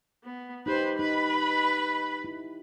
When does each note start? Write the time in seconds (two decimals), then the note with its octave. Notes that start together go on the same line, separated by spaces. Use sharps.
0.24 B3
0.66 D#4 G4 B4 C5
0.99 D#4 B4 B5
2.24 E4